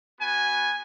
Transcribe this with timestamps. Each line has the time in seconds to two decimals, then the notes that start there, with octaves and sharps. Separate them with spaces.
0.19 B3 F#4 G#5